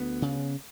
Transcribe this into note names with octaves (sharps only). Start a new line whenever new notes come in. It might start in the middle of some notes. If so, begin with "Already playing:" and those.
Already playing: D2 B3
C#3